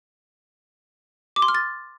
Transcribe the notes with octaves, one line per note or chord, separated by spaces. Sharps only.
D6
C6
F6
A6